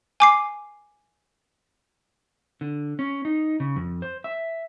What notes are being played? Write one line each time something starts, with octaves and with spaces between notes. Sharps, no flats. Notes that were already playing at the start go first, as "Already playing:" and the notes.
G#5 D6 C7
D3
C#4
D#4
C#3
F2
C5
E5